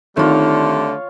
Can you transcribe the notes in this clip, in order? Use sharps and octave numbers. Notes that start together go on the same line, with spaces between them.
D3 D#3 G3 A3 C4 F4 C#5